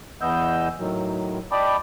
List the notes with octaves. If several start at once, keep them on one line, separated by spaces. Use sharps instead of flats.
E2 E3 B3 D#5 E6 G6
A2 D#3 F#3
D5 D#5 G5 A5 B5 D6